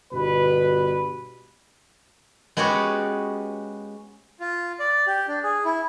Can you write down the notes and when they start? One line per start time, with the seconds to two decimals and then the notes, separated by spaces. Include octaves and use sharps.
0.13 G1 B2 G3 B4
2.57 G#3 B3 C#4 F#4 G4
4.40 F4
4.80 D5
5.07 G4
5.28 D4
5.43 G#4
5.65 E4